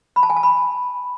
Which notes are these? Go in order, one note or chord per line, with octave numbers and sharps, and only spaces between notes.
B5
A5
G#5
A5
B5